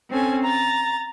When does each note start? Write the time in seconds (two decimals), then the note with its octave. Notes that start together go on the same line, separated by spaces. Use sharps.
0.11 C4 C#4 A4 G#5
0.42 A#5 A6